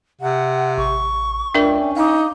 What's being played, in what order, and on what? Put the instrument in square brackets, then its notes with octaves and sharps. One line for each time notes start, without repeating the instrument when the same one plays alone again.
[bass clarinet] C3 [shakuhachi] F#5
[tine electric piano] A1 [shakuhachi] C#6
[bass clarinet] C#2 [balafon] D4 A#4 [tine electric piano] D5 E5 G5
[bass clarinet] C#4
[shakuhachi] D#4 [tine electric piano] F5 D6